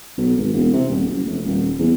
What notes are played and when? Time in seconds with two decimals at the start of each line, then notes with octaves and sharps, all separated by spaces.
0.18 B1
0.37 G#1
0.53 E1
0.72 C3
0.89 D#1
1.03 F#1
1.25 F1
1.46 D#1
1.79 E2